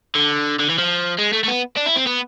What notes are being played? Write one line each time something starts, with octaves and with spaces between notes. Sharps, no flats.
D3
D3
E3
F3
G#3
A3
A3
B3
D4
E4
C4
B3